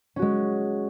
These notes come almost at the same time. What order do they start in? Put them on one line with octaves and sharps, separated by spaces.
C#4 F#4 G#3